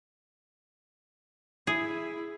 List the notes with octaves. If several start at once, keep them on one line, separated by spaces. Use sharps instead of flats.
E4 G#4